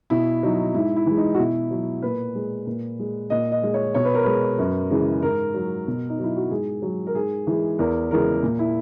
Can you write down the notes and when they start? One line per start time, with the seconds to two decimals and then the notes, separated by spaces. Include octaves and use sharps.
0.10 B2 E4
0.43 F#3 D#4
0.74 G#2 E4
0.96 E4
1.06 E3 G#3
1.17 D#4
1.34 F#4
1.38 B2 E4
1.71 F#3
2.02 A#2 B4
2.35 G#3
2.66 A#2
2.99 G#3
3.30 A#2 D#5
3.52 D#5
3.63 G#3
3.74 C#5
3.94 B2 C#5
4.05 B4
4.14 A#4
4.23 G#3 B4
4.59 F#2
4.90 C#3 E3 G#3
5.22 G#2 A#4
5.54 F#3
5.87 B2
6.09 D#4
6.19 F#3
6.24 E4
6.36 F#4
6.51 G#2 G#4
6.82 F#3
7.07 A#4
7.14 G#2 G#4
7.47 E3 G#3
7.79 E2 A#4
8.10 C#3 E3 G#3 A#4
8.43 A#2
8.59 E4